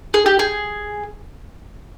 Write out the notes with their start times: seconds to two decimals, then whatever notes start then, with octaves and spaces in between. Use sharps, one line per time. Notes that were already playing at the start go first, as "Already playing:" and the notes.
0.14 G#4
0.26 G4
0.39 G#4